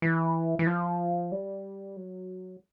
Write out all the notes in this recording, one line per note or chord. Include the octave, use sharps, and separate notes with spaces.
E3
E3
F3
G3
F#3